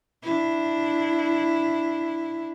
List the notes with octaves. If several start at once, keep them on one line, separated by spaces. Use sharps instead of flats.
D4 E4